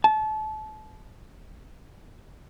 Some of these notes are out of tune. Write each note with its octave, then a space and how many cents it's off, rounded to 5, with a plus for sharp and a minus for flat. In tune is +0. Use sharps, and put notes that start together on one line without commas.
A5 -30